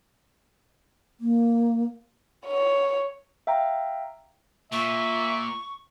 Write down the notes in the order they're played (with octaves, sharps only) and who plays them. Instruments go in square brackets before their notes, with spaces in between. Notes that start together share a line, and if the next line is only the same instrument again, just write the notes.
[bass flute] A#3
[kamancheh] C#5
[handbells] E5 F5 G5 A#5
[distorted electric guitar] A#2 [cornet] E5 [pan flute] C#6